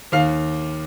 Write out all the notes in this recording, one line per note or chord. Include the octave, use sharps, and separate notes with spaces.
D#2 F5